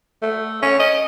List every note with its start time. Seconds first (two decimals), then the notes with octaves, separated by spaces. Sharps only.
0.22 A3
0.62 C#4
0.79 D#5